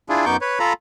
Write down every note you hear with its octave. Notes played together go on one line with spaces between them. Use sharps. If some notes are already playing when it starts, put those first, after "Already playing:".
D4 E4 F4 G#4
F#2 B3 D#4 C#6 D6 G6
B4 C#5
F4 A4 A#5 B5